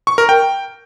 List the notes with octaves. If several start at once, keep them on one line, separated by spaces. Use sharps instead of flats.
C#6
A#4
G5